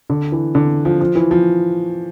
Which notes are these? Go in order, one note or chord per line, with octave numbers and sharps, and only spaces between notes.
D3
E3
D3
F3
F3
E3
F3